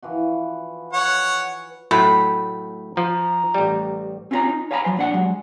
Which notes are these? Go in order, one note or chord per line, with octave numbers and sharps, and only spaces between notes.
E3 F3 F#4
C#5 F#5
A2 F#3 A3 B5
F3 A#5
A1 G3
C4 C#4 E4 F4 C#5 A#5
D#4
C#5 F5 G#5 A#5 B5
F3 F#3 C5
A#2 D4 F#5
F#3 G#3